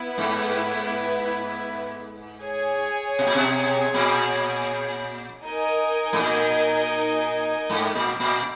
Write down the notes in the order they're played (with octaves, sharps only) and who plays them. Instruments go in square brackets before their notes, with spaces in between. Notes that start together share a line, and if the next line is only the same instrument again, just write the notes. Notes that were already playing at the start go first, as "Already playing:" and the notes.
Already playing: [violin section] B3 E4 B4
[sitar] G#2
[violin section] G#4 C#5 G#5
[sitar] B2
A#2
B2
A#2
[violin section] D#4 A#4 D#5 G#5
[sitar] G#2
A#2
G#2
A#2
A#2